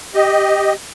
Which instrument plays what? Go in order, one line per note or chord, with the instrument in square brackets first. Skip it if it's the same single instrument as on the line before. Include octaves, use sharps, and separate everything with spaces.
[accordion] G4 D#5